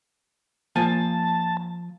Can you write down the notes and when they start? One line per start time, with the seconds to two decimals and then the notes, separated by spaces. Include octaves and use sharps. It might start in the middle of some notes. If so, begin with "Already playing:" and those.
0.76 F3 A#3 G#5 A5